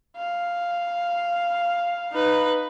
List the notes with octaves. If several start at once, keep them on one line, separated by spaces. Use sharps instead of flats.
F5
D#4 B4